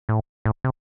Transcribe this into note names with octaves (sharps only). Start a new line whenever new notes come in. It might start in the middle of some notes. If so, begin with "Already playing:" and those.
A2
A2
C3